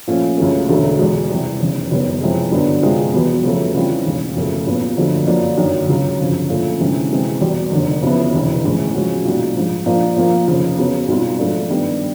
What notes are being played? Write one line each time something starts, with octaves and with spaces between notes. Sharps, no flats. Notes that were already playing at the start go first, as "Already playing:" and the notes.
A#2 F3 A3 C#4
C#2 C#3 F#3 A3
E1 D2 D3 F#3 A3
E2 B2 G#3
C3 E3 G3
F1 E2 C#3
F#1 F#2 D#3 G3 B3
F2 C3 E3 G#3
G2 D3 F#3 B3
F2 C3 F3 G#3
E2 B2 G3 B3
F2 C#3 F#3 A3
C#3 E3 G3 C4 F4
E1 D#2 C#3
F#1 F#2 C#3 F3 A3
A#1 A#2 F#3 B3
G1 F2 D3 F#3 A3
F#2 D3 F3 A#3 D4
G1 F#2 D#3
C#2 C#3 F#3
G1 F2 C#3
A#2 F3 A3 C#4
D2 C3 E3 G#3 C#4
C3 E3 G#3 C4
E2 B2 G3
F1 D#2 D3
F2 C#3 F#3 B3 E4
E1 D2 C3 E3
A#1 A2 E3 G#3 C#4
C#3 F3 G#3 C#4 F#4
B1 A#2 G3
A#1 G#2 F3
A#2 F3 A#3 D4
A#2 F3 A#3
F1 F2 C#3 F3
C#3 F#3 B3
B1 B2 G3 C4 F4
G#2 F3 A3 D4
G2 D#3 G3 B3